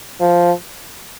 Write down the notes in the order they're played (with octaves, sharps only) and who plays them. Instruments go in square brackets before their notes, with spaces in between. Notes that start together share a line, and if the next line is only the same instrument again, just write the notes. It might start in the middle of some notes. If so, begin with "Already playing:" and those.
[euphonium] F3